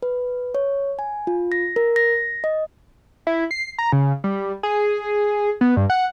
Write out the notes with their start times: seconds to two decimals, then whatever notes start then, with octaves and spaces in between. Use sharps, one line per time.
0.03 B4
0.55 C#5
0.99 G#5
1.27 F4
1.52 A#6
1.76 A#4
1.96 A#6
2.44 D#5
3.27 E4
3.51 C7
3.78 A#5
3.92 C#3
4.24 G3
4.63 G#4
5.61 B3
5.77 G2
5.90 F#5